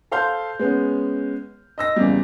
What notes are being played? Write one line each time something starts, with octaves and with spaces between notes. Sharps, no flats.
A4 C5 F5 C6 F6 G6
G#3 B3 C#4
D#5 E6 A#6
E2 A#2 C#3 G3